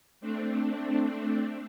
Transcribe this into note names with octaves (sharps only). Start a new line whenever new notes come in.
A3 C4 D4